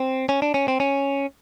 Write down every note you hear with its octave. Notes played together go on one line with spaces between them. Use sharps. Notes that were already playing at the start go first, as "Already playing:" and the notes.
Already playing: C4
C#4
D4
C#4
C4
C#4